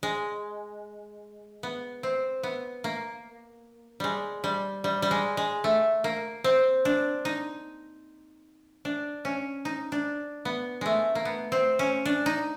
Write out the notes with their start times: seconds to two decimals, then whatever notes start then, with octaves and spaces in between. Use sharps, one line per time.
0.03 G#3
1.63 B3
2.03 C4
2.43 B3
2.84 A#3
4.00 G3 G#3
4.44 G3
4.84 G3
5.02 G3
5.11 G#3
5.37 G#3
5.64 A3
6.04 A#3
6.44 C4
6.85 D4
7.25 D#4
8.85 D4
9.25 C#4
9.65 D#4
9.92 D4
10.45 B3
10.81 G#3 A3
11.15 A#3
11.25 B3
11.52 C4
11.79 C#4
12.05 D4
12.26 D#4